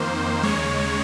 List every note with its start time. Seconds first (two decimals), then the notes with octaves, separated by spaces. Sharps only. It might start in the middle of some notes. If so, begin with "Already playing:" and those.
Already playing: F2 D#3 A#3 C5
0.43 D#2 C#3 G#3 C#5